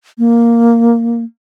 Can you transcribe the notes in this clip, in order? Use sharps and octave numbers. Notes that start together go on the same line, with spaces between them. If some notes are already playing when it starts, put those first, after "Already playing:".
A#3